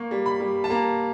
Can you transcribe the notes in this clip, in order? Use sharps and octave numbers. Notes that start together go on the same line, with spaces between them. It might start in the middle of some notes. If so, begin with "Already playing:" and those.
Already playing: A#3 C#6
G3
B5
G3
A5
A#3 A#5